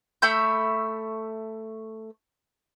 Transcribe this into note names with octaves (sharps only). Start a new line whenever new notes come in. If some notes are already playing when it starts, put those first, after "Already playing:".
A3 E5 B5 G6